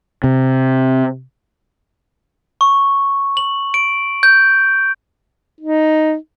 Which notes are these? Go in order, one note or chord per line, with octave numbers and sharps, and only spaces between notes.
C3
C#6
F#7
D7
G6
D#4